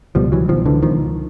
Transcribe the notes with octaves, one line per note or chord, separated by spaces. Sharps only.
C#2 B2 F3 G3
E3 F#3
C#2 B2 D#3 F3
D3 E3
C#2 B2 D#3 F3